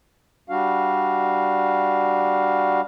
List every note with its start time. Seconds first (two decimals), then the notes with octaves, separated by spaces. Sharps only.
0.50 G3 D4 F#4 F5